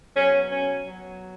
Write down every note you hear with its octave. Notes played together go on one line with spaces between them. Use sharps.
B2 F#3 C#4
C#4
B2 F#3